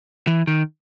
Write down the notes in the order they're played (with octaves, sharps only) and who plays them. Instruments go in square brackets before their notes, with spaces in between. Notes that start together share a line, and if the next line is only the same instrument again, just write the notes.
[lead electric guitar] E3
D#3